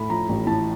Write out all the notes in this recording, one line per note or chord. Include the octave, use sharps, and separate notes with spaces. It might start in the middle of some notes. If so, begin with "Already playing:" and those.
Already playing: A2 A3 B5
F3 A#5
A1
A2 A5